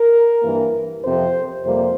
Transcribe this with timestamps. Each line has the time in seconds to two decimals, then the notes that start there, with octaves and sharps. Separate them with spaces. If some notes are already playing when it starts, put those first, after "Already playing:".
Already playing: A#4
0.42 G2 E3 A#3
1.04 F2 C3 F3 C5
1.64 F2 C3 G3 A#3 C5